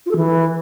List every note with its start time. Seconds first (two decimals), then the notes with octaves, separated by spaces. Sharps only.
0.06 F4
0.11 A4
0.16 E3